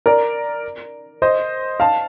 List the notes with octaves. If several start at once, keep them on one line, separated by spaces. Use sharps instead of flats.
A#4 D5
C5 D#5
F5 A5